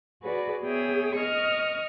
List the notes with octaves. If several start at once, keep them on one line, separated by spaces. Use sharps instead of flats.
F#4 G#4 B4 D5
B3 G#4 C#5 E5 G5 D#6
D#5 C#6 D#6 F6